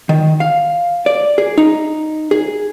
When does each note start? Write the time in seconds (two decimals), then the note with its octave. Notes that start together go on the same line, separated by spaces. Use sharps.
0.09 D#3
0.40 F5
1.06 D5
1.38 G#4
1.58 D#4
2.31 G#4